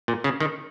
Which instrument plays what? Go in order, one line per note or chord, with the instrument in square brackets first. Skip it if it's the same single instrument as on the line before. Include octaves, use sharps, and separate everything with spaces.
[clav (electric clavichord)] A#2
C#3
D#3